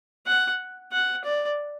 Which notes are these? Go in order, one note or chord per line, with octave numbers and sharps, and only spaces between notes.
F#5
F#5
D5